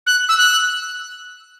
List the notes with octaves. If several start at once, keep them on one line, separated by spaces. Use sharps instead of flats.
F#6
E6
F#6